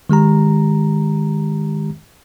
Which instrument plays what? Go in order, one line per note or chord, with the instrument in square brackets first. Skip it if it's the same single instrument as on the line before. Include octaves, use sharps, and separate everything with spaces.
[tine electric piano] D#3 G#3 G4 A#5